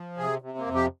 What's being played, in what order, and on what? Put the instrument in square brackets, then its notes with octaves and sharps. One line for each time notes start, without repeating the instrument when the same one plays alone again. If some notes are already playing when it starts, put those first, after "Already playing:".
Already playing: [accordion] F3
C3 G#4
C3
A#3
F2
G4